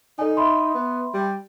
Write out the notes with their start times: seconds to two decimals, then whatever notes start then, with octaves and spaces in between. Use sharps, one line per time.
0.19 D#4 A4 D5 G#5
0.37 E5 B5 C6
0.75 B3
1.14 G3